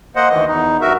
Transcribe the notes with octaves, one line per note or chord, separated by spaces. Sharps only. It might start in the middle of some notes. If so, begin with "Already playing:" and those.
A#3 C5 D#5 F#5
D2 D#3 E3 D#5
E2 D#4
G2 F#4 A#4 E5